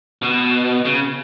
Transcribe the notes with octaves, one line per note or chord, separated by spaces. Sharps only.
B2
C#3